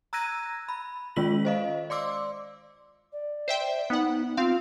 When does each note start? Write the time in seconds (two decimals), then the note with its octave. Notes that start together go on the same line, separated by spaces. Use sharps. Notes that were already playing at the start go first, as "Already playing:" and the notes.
0.13 A#5 E6 F#6 G#6 A#6 D#7
0.69 B5
1.16 D#3 G#3 C#4 F4 B6 F#7
1.45 C5 D#5 F5
1.90 D5 C6 D6 E6
3.12 D5
3.48 C5 E5 G5
3.90 B3 D#4 F#5
4.37 C4 F4 F5